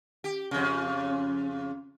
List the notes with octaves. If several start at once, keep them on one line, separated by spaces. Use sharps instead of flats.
G4
F2 C#3